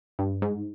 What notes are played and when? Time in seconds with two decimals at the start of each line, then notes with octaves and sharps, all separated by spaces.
0.19 G2
0.42 G#2